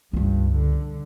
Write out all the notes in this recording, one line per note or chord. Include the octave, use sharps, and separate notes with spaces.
C#2 G2 G3
D3